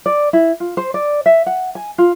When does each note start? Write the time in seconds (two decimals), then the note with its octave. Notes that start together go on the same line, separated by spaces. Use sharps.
0.06 D5
0.33 E4
0.60 F4
0.77 C5
0.94 D5
1.26 E5
1.46 F#5
1.75 G#5
1.98 F4